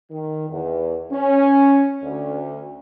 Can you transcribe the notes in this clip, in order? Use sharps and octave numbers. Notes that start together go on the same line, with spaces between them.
D#3
E2
C#4
D2